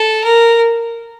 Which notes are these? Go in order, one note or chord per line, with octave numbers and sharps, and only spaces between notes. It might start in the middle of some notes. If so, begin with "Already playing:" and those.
Already playing: A4
A#4